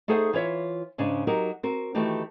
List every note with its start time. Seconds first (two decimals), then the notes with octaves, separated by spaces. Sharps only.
0.08 A3 D#4 G#4 A4 C5 F#5
0.33 E3 F4 C#5 E5
0.98 G#2 C#3 G#3 D4
1.27 F#3 D#4 F#4 G4 A#4
1.63 C4 F#4 A#4
1.95 D#3 E3 A3 F#4 G4